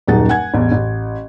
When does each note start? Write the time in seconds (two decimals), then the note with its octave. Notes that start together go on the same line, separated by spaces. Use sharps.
0.07 D#1 F#2 D#4 G#4 F#5 A6
0.29 F#5 G#5 G#6
0.54 A1 E2
0.72 A1